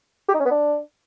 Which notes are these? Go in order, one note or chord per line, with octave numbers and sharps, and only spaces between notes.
G4
D#4
C#4
B3
D4